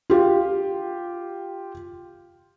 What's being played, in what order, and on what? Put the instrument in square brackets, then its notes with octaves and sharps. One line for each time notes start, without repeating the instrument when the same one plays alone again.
[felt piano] F4 G4